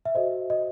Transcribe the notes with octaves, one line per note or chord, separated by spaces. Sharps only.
E5
F#4 A4 C5 D#5
D#5